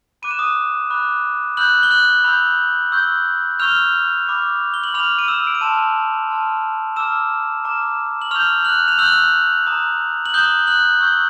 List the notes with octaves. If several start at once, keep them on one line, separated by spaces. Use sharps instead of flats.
B5 D6 F#6 D#7
E7
D#6 D#7
B5 D6 F#6
B5 E6 F#6 G6 F#7
G7
F#6 F#7
B5 E6 G6
C#6 E6 G6
C#6 E6 F6 G6 F7
B5 D6 F6
G7
F#7
B5 D6 F6 F7
D#7
E6 E7
D7
D#7
A5 C6 E6 F6 E7
A5 C6 F6
A#5 D6 E6 F6 E7
A#5 D6 F6
F#7
C#6 E6 F6 G6 F7
F#6 F#7
F7
C#6 E6 F#6 G6 F#7
A#5 D#6 F#6
F#7
A#5 D#6 F#6 G6 G7
F#6 F#7
C#6 E6 G6